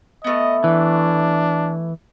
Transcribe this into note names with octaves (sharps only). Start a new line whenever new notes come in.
A3 B3 D#5
E3 D4